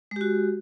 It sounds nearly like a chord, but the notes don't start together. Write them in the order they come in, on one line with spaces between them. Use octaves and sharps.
G#3 G4 F#4